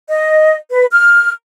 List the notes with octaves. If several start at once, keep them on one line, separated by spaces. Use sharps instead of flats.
D#5
B4
F6